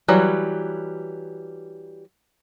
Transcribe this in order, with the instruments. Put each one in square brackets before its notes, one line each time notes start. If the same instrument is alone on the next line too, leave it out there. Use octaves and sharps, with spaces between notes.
[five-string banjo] E3 F#3 G3